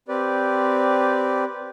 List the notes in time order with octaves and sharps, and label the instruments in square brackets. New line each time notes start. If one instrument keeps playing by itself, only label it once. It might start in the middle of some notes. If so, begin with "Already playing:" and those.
[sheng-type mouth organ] C4 G4 B4 D5